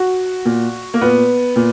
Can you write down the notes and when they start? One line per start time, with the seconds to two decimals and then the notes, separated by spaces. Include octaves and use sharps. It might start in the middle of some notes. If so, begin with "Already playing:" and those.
Already playing: F#4
0.45 A#2
0.94 A#3
1.01 A#2 B3
1.56 A#2